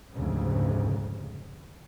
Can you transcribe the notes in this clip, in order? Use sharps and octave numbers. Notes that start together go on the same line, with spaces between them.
F1 D2 G#2 C#3